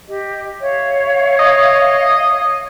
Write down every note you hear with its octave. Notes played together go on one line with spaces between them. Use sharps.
G4 D#5
C#5 E5 F5
D#5